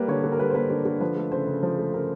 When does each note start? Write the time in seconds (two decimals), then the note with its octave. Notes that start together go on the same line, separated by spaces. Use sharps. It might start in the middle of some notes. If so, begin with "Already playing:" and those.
Already playing: G3 A#3 B4
0.08 D3 C#5
0.24 D3
0.32 A#4
0.39 G3 B4
0.50 C5
0.55 A#3 B4
0.70 D3
0.85 D3
1.00 F3 B4
1.16 A3
1.31 C#3 C5
1.47 C#3
1.63 F3
1.78 A3
1.93 C#3 A#4